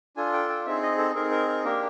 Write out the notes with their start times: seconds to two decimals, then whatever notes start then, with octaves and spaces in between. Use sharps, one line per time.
0.17 D4 F4 A4 G#5
0.33 G5
0.49 G5
0.66 C4 D#4 G#4 E5
0.82 D#5
0.98 A4
1.15 C4 D#4 G#4 A#4
1.31 A#4
1.48 A#4
1.64 A#3 D4 G4 A#4